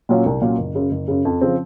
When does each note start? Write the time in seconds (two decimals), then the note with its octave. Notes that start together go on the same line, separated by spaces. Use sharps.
0.09 A#2 F#3 C#4 F4
0.26 C2
0.41 A#2 F#3 C#4 F4
0.58 F#1
0.75 F#2 C#3
0.91 F#1
1.08 F#2 C#3
1.25 F2
1.41 C#3 F3 C4